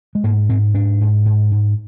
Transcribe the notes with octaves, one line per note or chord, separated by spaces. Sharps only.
G#3
G#2 A#3
G#2 C4
G#2 D4
G#2
G#2
G#2